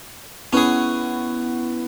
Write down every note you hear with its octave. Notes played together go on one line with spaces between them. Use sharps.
B3 C#4 E4 G#4 B4